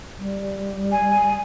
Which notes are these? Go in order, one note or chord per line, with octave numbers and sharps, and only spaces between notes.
G3
G#5